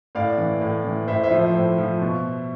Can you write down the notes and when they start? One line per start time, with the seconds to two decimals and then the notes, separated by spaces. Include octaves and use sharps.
0.15 A2 D5 F5
0.38 E3
0.61 A2
0.84 E3
1.08 A2 C5 E5
1.23 C5 E5
1.31 F3
1.39 C5 E5
1.54 A2
1.78 F3
2.01 B2